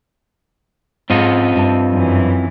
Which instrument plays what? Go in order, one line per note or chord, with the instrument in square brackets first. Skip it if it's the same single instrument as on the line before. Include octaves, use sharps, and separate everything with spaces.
[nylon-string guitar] G#2 C#4 [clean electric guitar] C4 F4 D#5
[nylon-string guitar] G2 E5 A5
[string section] F#2 E3